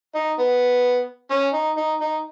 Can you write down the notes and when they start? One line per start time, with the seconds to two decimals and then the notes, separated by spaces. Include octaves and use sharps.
0.15 D#4
0.39 B3
1.31 C#4
1.54 D#4
1.77 D#4
2.01 D#4